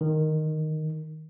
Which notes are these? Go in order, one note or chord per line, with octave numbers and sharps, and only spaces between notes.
D#3